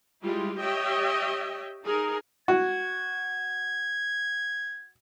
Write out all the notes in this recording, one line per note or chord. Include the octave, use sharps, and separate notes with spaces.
G3 G#3 E4 F4 G4
G4 C#5 D#5 E5 G5
D#4 G#4 A#4
F#4 G#6